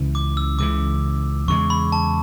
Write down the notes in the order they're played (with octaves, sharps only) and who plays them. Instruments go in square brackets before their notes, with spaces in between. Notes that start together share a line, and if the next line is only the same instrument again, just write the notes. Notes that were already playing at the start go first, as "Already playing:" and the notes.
Already playing: [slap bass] C#2 C#3 E3
[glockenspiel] D6
E6
[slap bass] C#2 C#3 E3 [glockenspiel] D6
[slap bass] E2 C#3 G#3 [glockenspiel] C#6
[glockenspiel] B5
A5